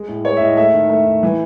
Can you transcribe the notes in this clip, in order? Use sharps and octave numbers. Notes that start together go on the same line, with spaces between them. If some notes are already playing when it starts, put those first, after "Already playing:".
Already playing: G#3
A2
G#3 C#5
E5
A2 D#5
A3 E5
D#3
A3
D#3
E3